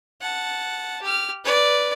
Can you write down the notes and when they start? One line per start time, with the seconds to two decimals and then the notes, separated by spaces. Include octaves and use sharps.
0.21 F#5 A5
1.02 G4 F6
1.44 B4 D5